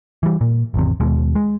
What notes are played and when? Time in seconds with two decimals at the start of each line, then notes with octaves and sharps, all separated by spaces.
0.23 E3 G3
0.41 A#2
0.74 G#1 E2 C3
1.00 D#2 B2 G#3
1.35 G#3